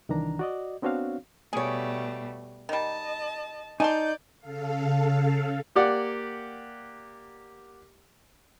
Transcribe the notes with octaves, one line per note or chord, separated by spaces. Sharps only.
C2 D#3 E3 D4 A#5
F#4 D5 D#5
B3 C4 D4 F#4 C#5 F5
B2 G3 A3 G#4 C#5
D#3 G3 D#5 A5
D#4 D5 G#5 A5 C6 G6
C#3 A4 F5
A#3 G4 D5 F#5